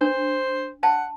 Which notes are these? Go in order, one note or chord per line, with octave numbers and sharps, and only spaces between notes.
D4 C5
F#5 A5